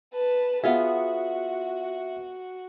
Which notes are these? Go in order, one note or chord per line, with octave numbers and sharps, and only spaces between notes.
B4 A5
B3 F4 F#4 G#4 E5